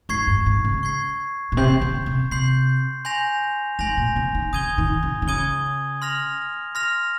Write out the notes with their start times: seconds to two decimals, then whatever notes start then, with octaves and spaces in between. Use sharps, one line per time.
0.09 G#2 C#6 G#6 C7
0.27 G2
0.46 G#2
0.65 C#3
0.83 C#6 G#6 C7
1.52 A#2
1.57 C3 C6 G6 C7
1.81 C#3
2.06 C3
2.31 C3 C6 G6 C7
3.05 G#5 C6 G6 A#6 F7
3.79 G#2 G#5 C6 G6 A#6 F7
3.97 A#2
4.16 C#3
4.35 D#3
4.53 C#3 D#6 G#6 D#7 G7
4.78 D#3
5.03 C#3
5.22 D#3
5.27 C#3 D#6 G#6 D#7 G7
6.02 C6 F6 A#6 F7
6.75 C6 F6 A#6 F7